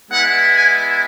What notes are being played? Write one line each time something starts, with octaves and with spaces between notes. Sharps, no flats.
G#3 B3 E4 F#5
G#5